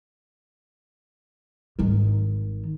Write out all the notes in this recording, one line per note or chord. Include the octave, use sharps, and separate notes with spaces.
G#1 D#3